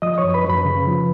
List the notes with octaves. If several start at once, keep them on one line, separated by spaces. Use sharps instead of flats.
F3 D#5 D#6
C#5 C#6
F#2
B4 B5
F#2
B4 B5
C#3
F3